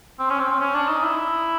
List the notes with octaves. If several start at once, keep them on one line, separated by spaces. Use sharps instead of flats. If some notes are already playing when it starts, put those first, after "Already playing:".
C4
C#4
C4
C4
C#4
D4
D#4
E4